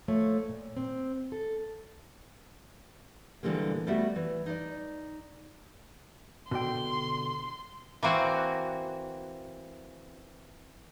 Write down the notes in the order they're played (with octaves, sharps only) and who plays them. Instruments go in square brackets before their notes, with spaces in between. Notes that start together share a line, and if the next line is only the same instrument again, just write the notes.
[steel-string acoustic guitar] F3 A3 C#5
A#2
C4
A4
[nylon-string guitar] A#2 D3 E3 G3 G#3 A#3
G3 A3 B3 F#4 G4 E5
E3
D#4 D5
[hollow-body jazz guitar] B2 D3 G5 [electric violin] C6
[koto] E3 A#3 C4 F#4